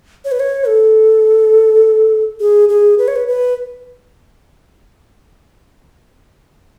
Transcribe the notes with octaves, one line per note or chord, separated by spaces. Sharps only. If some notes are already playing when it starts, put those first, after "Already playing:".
C#5
B4
C#5
A4
G#4
G#4
B4
C#5
B4
B4